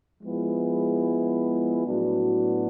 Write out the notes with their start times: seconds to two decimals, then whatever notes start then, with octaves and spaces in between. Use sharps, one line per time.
0.23 F3 G#3 B3 E4 G#4
1.86 A2 F#3 B3 D4 F#4